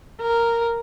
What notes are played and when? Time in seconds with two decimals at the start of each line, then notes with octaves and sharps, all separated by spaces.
0.22 A#4